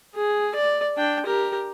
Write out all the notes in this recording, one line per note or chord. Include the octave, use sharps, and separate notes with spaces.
G#4
D5
D4 G5
G4 A#4